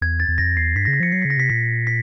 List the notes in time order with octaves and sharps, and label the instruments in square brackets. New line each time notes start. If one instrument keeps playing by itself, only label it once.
[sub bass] E2 [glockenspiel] G#6
[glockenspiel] A6
[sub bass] E2
[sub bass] F2 [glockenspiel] A#6
[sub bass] E2 [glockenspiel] C7
[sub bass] G2 [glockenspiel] B6
[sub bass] C#3 [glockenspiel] A#6
[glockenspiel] B6
[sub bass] F3 [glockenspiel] C#7
[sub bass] F#3 [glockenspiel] C7
[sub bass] C#3 [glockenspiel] B6
[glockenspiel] A#6
[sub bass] C3 [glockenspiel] B6
[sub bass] A#2 [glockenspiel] B6
[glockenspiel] B6